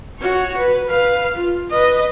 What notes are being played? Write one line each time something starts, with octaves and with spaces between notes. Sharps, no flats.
F#4 C#5
B4
B4 F5
F4
B4 D#5